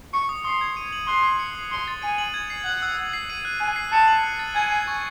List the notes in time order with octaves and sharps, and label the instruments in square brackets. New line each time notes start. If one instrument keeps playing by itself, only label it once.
[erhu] C#6 [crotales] C#7
[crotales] D#6
[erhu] C6 [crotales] D#6
[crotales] G#6
D#7
F#7
[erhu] C6 [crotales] F#6
[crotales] C7
C#7
D#6
[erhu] C6 [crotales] D#6
[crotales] A6
[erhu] G#5 [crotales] D#7
[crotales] F#7
G#6
C7
[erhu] F#5 [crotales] F#7
[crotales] E6
E6
C7
D#7
F#6
[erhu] G#5 [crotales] F#6
[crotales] C7
[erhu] A5 [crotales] C#7
[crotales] F#7
F#6
A6
[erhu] G#5 [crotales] G#6
[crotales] C7
C#6